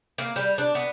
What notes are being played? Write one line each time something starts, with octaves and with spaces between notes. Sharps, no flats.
A#3
G3
D4
B3